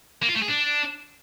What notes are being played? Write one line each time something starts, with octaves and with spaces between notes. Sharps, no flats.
A#3
F4
A3
G#4
D4